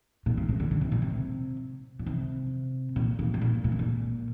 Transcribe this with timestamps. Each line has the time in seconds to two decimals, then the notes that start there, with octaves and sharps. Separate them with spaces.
0.26 A#2
0.37 G2
0.49 C3
0.60 D3
0.71 D3
0.81 C3
0.92 A#2
1.02 C3
1.99 A#2
2.06 C3
2.96 A#2
3.19 A#2
3.34 G2
3.42 A#2
3.64 A#2
3.72 C3
3.79 A#2